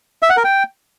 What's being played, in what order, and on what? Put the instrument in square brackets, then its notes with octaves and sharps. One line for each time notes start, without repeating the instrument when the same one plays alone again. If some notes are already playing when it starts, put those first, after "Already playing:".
[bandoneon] E5
F#5
A#4
G5